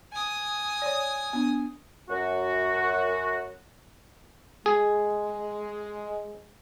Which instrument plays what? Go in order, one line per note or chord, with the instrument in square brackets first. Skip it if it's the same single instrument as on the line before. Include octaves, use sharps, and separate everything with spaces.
[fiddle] G#5 D#6
[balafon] C#5 D5
B3 D4
[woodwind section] F#2 F#4
[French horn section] G#3 [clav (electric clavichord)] G#4